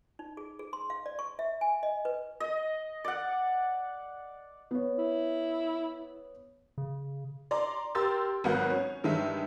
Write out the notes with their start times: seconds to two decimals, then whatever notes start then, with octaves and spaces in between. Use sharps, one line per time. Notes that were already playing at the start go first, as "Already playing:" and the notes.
0.19 D#4
0.37 G#4
0.59 G#4
0.73 C6
0.90 F5
1.06 D5
1.19 C#6
1.39 E5
1.61 G#5
1.83 D#5
2.05 B4
2.40 D#5
3.05 D5 F#5
4.71 B3 C#5
4.98 E4
6.78 C#3
7.51 D5 A#5 C6
7.95 G4 A#4 C6 E6 A6
8.44 G#1 F#3 B3 A#4 F#5 G6
8.70 C#4
9.04 G2 D#3 G#3 E5